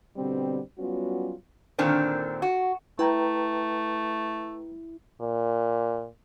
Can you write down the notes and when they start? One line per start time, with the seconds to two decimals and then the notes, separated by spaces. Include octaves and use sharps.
0.16 B2 D3 G3 B3 C4
0.78 F#3 G3 B3 C#4 F4 F#4
1.79 A#2 D3 D#3 C4 D4
2.42 F#4
2.99 A3 E4 B4 G5 A#5
5.20 A#2